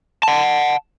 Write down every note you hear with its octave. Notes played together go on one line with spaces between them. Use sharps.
F#5 A5